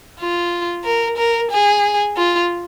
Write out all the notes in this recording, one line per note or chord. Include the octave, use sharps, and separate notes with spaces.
F4
A#4
A#4
G#4
F4